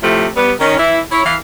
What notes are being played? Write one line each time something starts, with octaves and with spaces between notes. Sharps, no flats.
A2 C3 F3 A3
G3 B3
D#3 C#4
E3 E4
E4 C#5
E3 F5